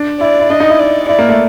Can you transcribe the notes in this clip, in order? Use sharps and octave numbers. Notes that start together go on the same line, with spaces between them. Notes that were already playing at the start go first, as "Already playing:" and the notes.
Already playing: D4
E4 D5
E4
D4 D#5
D#4
E4
D5
E4 D5
A#3
A3